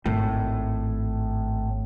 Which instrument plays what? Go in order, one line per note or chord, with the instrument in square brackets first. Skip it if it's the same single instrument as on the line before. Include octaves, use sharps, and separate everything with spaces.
[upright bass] G#1 [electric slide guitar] A2